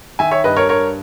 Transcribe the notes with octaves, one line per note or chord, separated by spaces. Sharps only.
D#3 E5 G#5
C#5 E5
G2 B4 D#5
A#4 C#5
G2 A#4 C#5